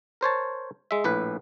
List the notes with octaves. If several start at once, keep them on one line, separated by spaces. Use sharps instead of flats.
A#4 C5 C#5 A5
G#3 E5
A#1 A2 B4